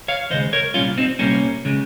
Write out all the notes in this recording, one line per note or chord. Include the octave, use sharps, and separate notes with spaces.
C#5 F5
D#2 C#3 G#3 C5 D#5
A#4 C#5
C2 A#2 G3 C#4 F4
C4 D#4
C2 A#2 G3 A#3 C#4
C#3 G#3